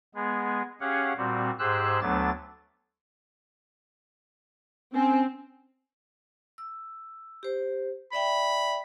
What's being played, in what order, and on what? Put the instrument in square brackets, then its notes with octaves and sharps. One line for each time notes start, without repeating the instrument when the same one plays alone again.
[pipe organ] G#3 B3 G#4
C#4 G4 G#4 C#5 F5 F#5
A#2 G3 C4 F#4
G#2 G4 G#4 C5 E6 F#6
D2 F#3 A3 B3 D4 A6
[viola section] C4 [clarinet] C#4
[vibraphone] E6
G4 C5
[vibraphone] D5 E5 G5 [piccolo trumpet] B5